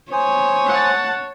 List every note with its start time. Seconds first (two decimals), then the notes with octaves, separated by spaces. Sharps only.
0.12 C5 C#5 G#5 D#6
0.68 F#5 A5